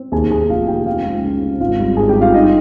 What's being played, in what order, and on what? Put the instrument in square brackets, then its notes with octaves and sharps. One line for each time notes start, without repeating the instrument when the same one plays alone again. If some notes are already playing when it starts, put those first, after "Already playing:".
Already playing: [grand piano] C4
D#2 G#4 G#5
D#2 G#4 G#5
F1 F4 F5
D#3 G4 G5
C4 F4 F5
C#2
C#3
C4
G#1 F4 F5
G3
G#1 G#4 G#5
G4 G5
G3
F4 F5
G2 D#4 D#5